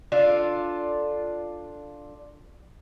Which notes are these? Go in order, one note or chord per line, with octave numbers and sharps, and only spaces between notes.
D4 F4 A4